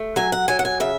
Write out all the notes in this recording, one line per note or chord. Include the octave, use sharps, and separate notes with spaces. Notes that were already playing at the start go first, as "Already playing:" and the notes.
Already playing: A3
F#3 G#5
F#5
F#3 G#5
F#5
G#5
C#3 E5